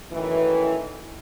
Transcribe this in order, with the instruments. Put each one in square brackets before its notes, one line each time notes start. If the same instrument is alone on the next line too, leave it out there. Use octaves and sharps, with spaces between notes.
[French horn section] F#2 A2 D#3 E3